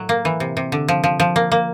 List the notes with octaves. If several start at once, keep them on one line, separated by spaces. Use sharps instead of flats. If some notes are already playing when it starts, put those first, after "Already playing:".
Already playing: A2 F#3
A#3
E3
C3
C3
D3
F3
F3
F3
A#3
A#3